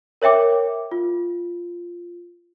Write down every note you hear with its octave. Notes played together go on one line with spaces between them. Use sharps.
A#4 C#5 E5 G5 D6
F4